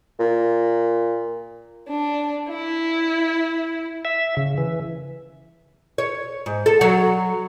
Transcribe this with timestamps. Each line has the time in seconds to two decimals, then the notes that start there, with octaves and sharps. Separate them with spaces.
0.19 A#2
1.88 D4
2.48 E4
4.05 E5
4.37 C#3
4.58 E3
5.98 C#5
6.46 G#2
6.66 A4
6.81 F#3